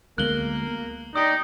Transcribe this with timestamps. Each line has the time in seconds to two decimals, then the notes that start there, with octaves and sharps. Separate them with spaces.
0.18 D2 G#3 A#3 B3 F#6 F#7 G7
0.67 B3
1.16 D#4 G4 D5 D#6